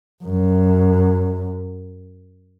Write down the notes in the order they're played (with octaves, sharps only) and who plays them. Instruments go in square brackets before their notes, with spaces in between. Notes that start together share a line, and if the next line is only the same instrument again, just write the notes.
[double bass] F#2